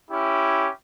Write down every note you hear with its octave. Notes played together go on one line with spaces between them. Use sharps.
C#4 E4 G4